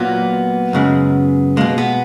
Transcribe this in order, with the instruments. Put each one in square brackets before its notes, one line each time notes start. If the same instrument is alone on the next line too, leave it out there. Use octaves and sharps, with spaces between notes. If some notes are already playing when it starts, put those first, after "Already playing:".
Already playing: [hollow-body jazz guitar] A#2 F#3 A#3 B3
F#2 C#3 G#3
B2 G#3 A#3
B3